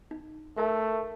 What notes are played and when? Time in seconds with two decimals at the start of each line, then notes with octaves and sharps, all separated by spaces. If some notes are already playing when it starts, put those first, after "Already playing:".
0.11 D#4
0.57 A3 A#4 E5 A5